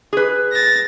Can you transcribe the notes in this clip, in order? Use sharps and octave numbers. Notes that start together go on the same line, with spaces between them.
G#4 B4
A6 A#6